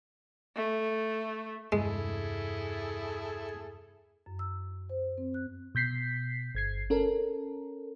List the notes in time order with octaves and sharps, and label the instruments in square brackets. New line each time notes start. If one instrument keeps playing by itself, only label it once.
[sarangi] A3
[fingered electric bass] E2 G2 C3 [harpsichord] G#3 [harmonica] E4 G#4 A4
[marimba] F#2
E6
C5
C4
F#6
[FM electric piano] B2 G6 B6 C7
G1 G#6 C7
C#4 A4 A#4